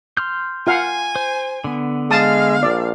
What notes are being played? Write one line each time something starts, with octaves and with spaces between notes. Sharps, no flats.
C6 F6 G6
F4 F5 F#5 G#5
C5
D3 B3
G#3 F5 A5 D#6
A#1 D5